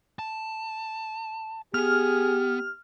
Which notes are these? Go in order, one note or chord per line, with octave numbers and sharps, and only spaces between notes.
A5
B3 G4 G#4 F6